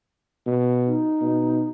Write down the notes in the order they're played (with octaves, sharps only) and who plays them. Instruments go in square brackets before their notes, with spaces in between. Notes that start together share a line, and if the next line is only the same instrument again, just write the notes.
[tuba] B2
[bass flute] D#4
[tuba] B2